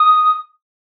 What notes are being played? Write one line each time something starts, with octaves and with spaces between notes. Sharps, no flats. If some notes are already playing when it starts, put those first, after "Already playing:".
Already playing: D#6